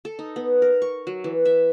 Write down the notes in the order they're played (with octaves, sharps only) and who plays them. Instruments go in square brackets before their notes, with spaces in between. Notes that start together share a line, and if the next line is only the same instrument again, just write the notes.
[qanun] A4
D#4
B3
A#4
C#6
F#3
E3
E5